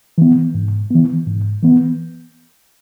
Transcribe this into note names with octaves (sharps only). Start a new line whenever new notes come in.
E3 B3
G#2
E3 B3
G#2
E3 B3